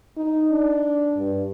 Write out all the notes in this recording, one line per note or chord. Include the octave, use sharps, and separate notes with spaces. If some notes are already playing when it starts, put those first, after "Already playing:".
D#4
D4
G2